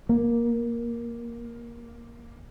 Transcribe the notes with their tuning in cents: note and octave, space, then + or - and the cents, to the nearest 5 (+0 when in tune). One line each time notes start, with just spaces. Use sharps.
A#3 +10